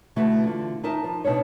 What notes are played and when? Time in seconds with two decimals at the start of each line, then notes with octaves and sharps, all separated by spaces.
0.16 B2 D3 E3 A3 F#4
0.44 D3 F4
0.83 D#2 D#4 A#4 E5 A5
1.04 F3
1.24 B2 D4 D#4 C#5